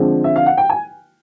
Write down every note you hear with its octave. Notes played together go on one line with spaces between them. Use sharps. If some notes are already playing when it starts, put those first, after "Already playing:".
Already playing: D3 F3 G#3 C4
E5
F5
F#5
G5
G#5